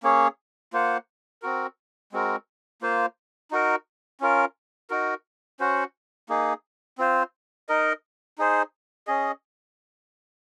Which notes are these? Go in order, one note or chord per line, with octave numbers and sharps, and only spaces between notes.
A#3 C#4 G#4 C#5
A#3 F4 C5 F#5
C4 F#4 A#4
G#3 C4 F#4 A#4
A#3 F4 C5
D#4 F#4 A#4
C#4 F4 A#4
D#4 F#4 A#4
C#4 F#4 C5 F#5
A#3 D#4 G#4
C4 F4 C5
D#4 A#4 D#5
D#4 G#4 C5
C#4 G#4 D#5